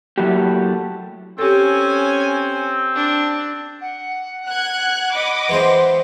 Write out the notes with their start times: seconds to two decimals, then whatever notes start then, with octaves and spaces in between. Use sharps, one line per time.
0.18 F#3 A3 A#3 E4 F#4 G4
1.38 C4 C#4 G4 A4 G#5
2.95 D4
3.81 F#5
4.49 F#6 G#6
5.15 D#5 B5 D6
5.49 E3 G#3 C4